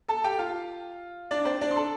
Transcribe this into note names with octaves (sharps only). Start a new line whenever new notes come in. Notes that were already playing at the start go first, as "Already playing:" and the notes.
A4 A5
G4 G5
F4 F5
D4 D5
C4 C5
D4 D5
C6
A4 A5